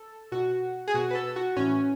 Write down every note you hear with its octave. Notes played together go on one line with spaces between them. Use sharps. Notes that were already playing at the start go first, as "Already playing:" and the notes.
Already playing: A4
B2 F#4
G#4
B2 F#4
B4
A4
F#4
A2 E3 C#4